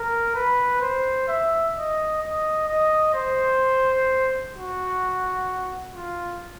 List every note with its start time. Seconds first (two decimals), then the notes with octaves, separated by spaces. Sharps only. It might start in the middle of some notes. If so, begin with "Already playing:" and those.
Already playing: A#4
0.35 B4
0.82 C5
1.28 E5
1.75 D#5
2.22 D#5
2.68 D#5
3.15 C5
4.55 F#4
5.95 F4